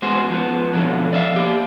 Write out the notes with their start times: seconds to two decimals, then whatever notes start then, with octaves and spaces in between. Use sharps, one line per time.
0.02 G#3 B3 F#4 G#4 C5
0.30 F3 B3
0.73 F2 B2 D3 D#3 F3 F#3
1.13 D5 E5 F5
1.36 A#3 G4